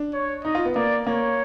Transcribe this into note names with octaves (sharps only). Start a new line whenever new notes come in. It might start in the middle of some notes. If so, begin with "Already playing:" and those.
Already playing: D4
C#5
D#4 D#5
F4
B3
A#3 D5
A#3 C#5